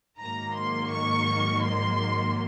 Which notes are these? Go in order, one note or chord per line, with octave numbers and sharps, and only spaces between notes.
G#2 D#3 F#3 A#3 A#5
C6
C#6
C6